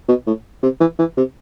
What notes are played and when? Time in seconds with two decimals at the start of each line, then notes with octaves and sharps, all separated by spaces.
0.08 B2
0.27 A2
0.63 C3
0.80 E3
0.99 E3
1.17 C3